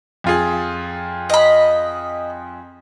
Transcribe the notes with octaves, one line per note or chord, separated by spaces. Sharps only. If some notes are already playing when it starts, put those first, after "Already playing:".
F2 F4 G#4
D#5 B5